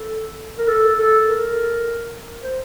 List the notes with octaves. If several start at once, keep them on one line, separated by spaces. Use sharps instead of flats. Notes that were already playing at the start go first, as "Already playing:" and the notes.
Already playing: A4
A#4
A4
A4
A#4
C5